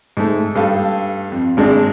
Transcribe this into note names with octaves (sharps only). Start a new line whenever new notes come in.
G#2 A3
G2 A4 F5
F2
G#1 G#3 D4